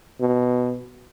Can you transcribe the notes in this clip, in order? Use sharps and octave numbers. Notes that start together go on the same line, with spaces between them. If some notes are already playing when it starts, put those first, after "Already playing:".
B2